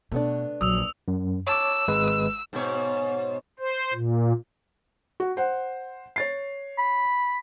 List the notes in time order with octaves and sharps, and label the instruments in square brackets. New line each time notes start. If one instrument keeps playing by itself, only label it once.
[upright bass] B2 [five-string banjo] A3 B3 D4
[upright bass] A#1 [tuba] F#3 [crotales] D#6 E6 F7
[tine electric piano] F#2
[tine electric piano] C#5 A5 D6 [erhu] E6
[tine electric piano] G#1 G#3 B4
[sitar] G#2 B2 C#5
[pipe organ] C5
A#2
[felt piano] F#4
C5 F#5
C#5 A6 C7
[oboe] B5